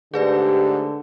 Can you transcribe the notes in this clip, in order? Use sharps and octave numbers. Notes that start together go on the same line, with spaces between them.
G#2 D3 A3 G4 G#4 B4 D5